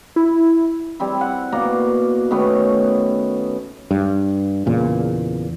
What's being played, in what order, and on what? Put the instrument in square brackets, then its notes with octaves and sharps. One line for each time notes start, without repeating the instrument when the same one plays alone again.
[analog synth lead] E4
[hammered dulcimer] G3 C4 E4
F#5
B2 A#3 D5 A#5
D#3 A3 B3 C#4
[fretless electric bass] G2
E2 A#2 C#3